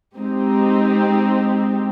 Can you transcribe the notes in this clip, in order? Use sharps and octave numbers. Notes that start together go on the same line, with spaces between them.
G#3 C4 D#4 G4